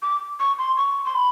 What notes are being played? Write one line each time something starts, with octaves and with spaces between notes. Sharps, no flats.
D6
C#6
C6
C#6
C6
B5